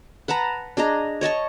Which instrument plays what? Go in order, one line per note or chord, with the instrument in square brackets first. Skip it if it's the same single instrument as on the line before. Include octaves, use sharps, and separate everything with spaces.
[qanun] B4 F#5 A5 A#5
D4 G#4 D#5 A#5
C#5 D#5 A5 C#6